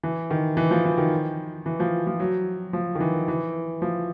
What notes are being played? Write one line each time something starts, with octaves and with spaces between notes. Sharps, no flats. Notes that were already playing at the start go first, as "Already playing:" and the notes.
E3
D#3
E3
F3
E3
D#3
E3
F3
F3
F#3
F3
D#3
E3
E3
F3